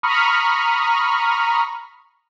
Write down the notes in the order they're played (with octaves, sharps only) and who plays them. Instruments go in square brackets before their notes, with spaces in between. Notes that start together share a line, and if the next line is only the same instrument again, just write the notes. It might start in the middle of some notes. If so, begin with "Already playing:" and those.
[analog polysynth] A#5 B5 C#6 D#6 F6